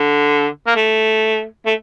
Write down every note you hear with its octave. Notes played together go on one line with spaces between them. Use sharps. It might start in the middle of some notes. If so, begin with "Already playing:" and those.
Already playing: D3
A#3
A3
A3